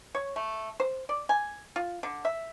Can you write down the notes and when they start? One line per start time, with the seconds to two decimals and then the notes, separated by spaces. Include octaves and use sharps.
0.15 C#5
0.36 A3
0.80 C5
1.09 D5
1.29 G#5
1.76 F4
2.03 D3
2.25 E5